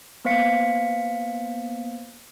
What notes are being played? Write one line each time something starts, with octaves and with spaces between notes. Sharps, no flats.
A#3 B3 C5 F5 B6 C#7